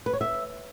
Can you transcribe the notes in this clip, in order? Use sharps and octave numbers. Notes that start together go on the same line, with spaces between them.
B4
C#5
E5